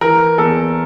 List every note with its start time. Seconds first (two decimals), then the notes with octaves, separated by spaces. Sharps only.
0.01 E3 A#4
0.38 E2 A4